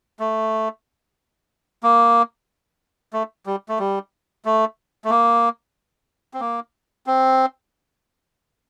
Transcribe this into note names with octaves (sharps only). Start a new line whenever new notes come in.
A3
A#3
A3
G3
A3
G3
A3
A3
A#3
C4
A#3
C4